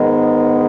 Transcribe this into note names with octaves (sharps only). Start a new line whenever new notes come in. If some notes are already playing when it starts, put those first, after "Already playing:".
Already playing: G#2 D#3 G#3 B3